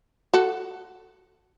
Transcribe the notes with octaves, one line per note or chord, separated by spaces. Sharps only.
F#4 A4